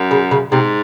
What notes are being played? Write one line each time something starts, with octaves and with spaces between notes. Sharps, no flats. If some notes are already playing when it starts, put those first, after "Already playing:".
Already playing: F#2
C#3
C#3
G#2 C3